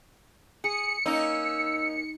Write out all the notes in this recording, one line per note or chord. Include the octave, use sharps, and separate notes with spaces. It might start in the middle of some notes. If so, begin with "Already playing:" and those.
G#4 C#7
A#3 C#4 D#4 E6